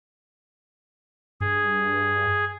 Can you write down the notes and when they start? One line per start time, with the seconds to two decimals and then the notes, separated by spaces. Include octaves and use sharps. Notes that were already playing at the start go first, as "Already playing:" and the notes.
1.41 G2 G#4